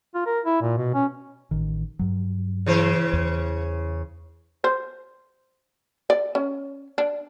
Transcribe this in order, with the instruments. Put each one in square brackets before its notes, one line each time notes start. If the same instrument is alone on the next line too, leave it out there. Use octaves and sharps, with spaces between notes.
[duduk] F4
A#4
E4
A#2
B2
C#4
[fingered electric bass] A1 D#3
G2 F#3
[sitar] C#3 E3 C5
[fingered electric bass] E2
[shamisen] C5
D5
C#4
D4